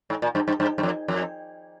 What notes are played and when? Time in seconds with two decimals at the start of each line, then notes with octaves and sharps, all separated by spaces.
0.10 G#2
0.22 A#2
0.35 G2
0.48 G2
0.60 G2
0.78 G2
0.83 F2
1.08 F2